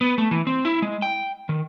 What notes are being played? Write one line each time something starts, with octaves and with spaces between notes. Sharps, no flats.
B3
A3
E3
C4
E4
G#3
G5
D#3